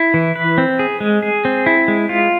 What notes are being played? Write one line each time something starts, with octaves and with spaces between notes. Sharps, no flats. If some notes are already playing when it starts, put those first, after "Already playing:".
Already playing: E4
E3
B4
C4
G#4
G#3
G#4
C4
E4
G#3
F4